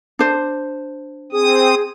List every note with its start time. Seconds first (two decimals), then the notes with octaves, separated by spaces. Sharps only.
0.19 D4 C5
1.32 C4 G#4 D#6